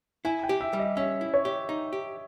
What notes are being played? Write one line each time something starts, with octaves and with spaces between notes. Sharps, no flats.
E4 G#5
G5
G4
E5
G3
D#5
C#4 E5
E4
C#5
G4
D#4
G4